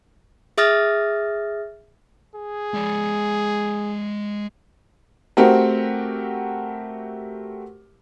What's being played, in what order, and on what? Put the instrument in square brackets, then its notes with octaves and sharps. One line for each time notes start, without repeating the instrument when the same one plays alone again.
[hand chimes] G#4 E5 D#6 F6 A6 A#6
[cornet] G#4
[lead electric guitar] G#3 D5
[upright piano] A3 C4 F#4 G4 A#4